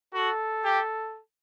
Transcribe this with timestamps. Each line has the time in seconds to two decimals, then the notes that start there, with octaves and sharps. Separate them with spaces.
0.14 F#4 A4
0.64 G4